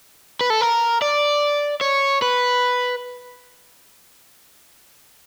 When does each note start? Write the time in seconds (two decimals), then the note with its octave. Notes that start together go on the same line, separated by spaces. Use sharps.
0.41 B4
0.50 A4
0.61 A#4
1.02 D5
1.81 C#5
2.22 B4